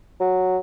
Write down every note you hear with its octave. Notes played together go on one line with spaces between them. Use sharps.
F#3